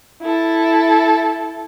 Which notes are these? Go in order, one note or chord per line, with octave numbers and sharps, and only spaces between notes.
E4 A4